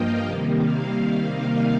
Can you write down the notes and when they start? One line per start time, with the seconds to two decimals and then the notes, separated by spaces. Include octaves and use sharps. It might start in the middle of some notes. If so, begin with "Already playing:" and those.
Already playing: G2 F3 A#3 D#5 F5 G5
0.24 C3 D#3 G3 A#3
0.58 F5
1.25 D#4